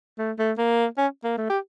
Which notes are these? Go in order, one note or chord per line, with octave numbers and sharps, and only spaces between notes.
A3
A3
A#3
C#4
A#3
A3
G4